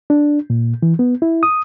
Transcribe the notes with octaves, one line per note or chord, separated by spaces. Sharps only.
D4
A#2
E3
B3
E4
D#6